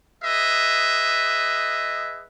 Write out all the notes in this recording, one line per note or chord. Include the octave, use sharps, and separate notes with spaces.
G#4 B4 D#5 E5